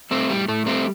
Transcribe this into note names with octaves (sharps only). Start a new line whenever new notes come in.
G3 A3 C4
A2 G3
A2 A3
G3 A3 C4